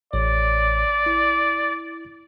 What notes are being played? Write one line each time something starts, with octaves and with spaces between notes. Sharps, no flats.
A1 C#5 D5
E4